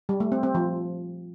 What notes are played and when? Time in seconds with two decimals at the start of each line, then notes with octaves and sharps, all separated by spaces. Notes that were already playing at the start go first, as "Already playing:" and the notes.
0.09 G3
0.20 A3
0.32 C4
0.43 C4
0.55 F3